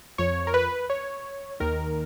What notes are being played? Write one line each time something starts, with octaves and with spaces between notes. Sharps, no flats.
F2 F3 C#5
A#4
B4
C#5
D#2 D#3 A#4